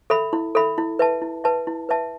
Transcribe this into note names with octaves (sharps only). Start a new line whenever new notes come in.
A4 E5 B5
E4
A4 E5 B5
E4
B4 E5 A5
E4
B4 E5 A5
E4
B4 E5 A5